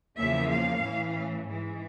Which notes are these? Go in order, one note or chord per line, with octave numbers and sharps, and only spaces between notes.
E2 C#3 F3 A#3 E5
F5
A2 E3 A3 C#4
G#2 E3 G#3